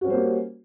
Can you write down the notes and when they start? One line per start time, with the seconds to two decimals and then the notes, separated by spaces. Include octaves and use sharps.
0.01 F#4
0.04 C#4
0.07 G3
0.10 C5
0.13 A#3